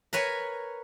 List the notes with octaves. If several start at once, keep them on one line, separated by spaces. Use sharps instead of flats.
A#4 B4 C#5 G#5